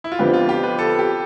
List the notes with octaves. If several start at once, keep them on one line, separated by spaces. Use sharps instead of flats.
E4
F4
F2 D3 F3 B3 G4
F4
G4
B4
A4
G4